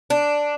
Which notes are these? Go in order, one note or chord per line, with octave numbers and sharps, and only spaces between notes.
D4